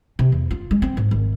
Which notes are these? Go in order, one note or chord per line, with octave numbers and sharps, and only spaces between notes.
C3
E2
F4
G#3
C4
G#2
G#1